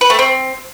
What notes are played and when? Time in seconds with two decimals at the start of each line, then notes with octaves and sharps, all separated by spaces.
0.01 B4
0.10 A3
0.19 C4